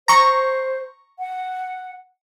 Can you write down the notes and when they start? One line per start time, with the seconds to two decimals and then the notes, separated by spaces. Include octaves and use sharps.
0.08 C5 A#5 C#6
1.19 F#5